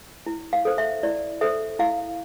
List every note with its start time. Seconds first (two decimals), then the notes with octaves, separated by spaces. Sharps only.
0.26 E4
0.53 F5
0.65 A4 C5
0.78 E5
1.03 E4 D5
1.41 A4 C5 E5
1.79 E4 F5